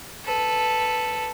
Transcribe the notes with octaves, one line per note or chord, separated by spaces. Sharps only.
A4 B4